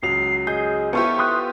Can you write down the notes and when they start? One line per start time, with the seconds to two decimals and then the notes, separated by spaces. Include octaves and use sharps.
0.03 C#2 F#3 C7 F7
0.47 G#4 D#5 G6
0.93 B3 E4 F4 G4 A4 C5 C#5 C#6
1.19 C6 D#6 F#6